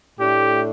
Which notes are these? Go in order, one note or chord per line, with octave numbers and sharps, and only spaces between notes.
A2 A3 D4 G4